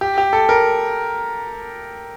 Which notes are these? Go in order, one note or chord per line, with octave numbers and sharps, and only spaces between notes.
G4
G4
A4
A#4